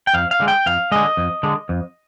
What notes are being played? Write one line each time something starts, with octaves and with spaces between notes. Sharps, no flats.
G5
F2 F5
F5
D3 G#3
G5
F2 F5
D3 G#3 D#5
F2
D3 G#3
F2